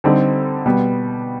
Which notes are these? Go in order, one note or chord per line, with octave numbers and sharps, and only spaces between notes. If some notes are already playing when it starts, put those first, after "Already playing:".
D3 G3 C4 D#4
B2 G3 B3